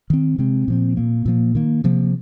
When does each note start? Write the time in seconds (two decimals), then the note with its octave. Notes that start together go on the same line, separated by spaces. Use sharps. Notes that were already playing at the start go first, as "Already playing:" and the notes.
0.10 D#3 C4
0.38 C3 G#3 C4
0.68 A#2 F3 C4
0.97 A#2 A#3
1.26 A#2 F3 A#3
1.55 D#3 A#3
1.84 C3 F3 A#3